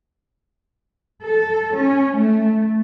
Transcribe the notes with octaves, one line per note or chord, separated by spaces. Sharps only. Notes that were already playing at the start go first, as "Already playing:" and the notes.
A4
C#4
A3